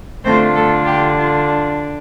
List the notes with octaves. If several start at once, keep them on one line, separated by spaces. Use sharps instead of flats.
D3 A3 C4 D4 F4 C5
A3 A4
G4
F4